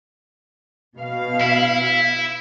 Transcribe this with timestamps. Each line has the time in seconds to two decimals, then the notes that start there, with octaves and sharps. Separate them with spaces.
0.97 B2 F5
1.41 E4